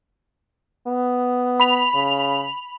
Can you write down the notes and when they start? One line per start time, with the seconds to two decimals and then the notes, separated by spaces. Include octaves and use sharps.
0.87 B3
1.60 B5 F7
1.95 C#3